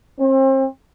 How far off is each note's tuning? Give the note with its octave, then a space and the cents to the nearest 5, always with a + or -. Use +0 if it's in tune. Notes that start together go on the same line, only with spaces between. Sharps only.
C4 +35